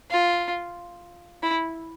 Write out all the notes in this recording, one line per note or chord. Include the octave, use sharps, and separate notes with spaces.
F4
E4